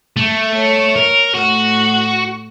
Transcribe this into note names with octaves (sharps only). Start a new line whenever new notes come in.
A3
C#5
A#4
A2 F#4